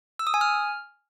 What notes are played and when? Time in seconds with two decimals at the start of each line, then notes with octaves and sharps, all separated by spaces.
0.19 E6
0.27 D#6
0.34 G#5
0.41 F6